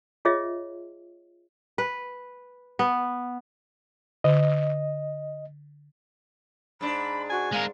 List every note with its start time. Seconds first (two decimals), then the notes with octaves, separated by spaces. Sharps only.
0.25 F4 G#4 C#5 D#5 E5
1.78 B4
2.79 B3
4.24 D3 D#5
6.81 G#2 D4 B5
7.30 F#4 G#5
7.52 G#3 A#4 F5